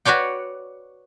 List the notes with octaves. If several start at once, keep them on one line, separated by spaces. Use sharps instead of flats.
F#4 B4 C#5 D5 G5